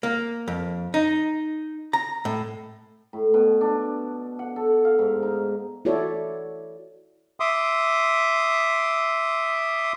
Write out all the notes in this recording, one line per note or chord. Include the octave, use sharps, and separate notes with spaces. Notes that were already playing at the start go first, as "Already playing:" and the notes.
A#3
F2
D#4
A#5
A2
A2
B2
D4
F#5
A4
F5
G#2
D#4
E4 F#4 A4 C#5 D5
E5 C6 D6 D#6